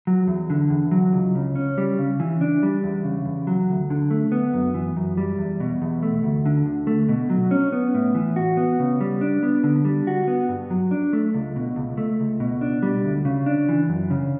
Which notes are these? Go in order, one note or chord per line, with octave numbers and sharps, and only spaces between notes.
F#3
E2
D3
E2
F#3
C#2
C#3
C#4
G3
C#3
E3
D4
G3
E2
C#3
E2
F#3
D2
D3
A3
B3
F#2
E3
F#2
G3
E2
B2
E2
A3
D2
D3
D2
A3
B2
F#3
C#4
B3
A2
E3
F#4
B3
C#3
G3
D4
B3
D3
G3
F#4
B3
G2
F#3
D4
A3
C#2
B2
C#2
A3
C#2
B2
D4
G3
D2
C#3
D4
E3
F#2
C#3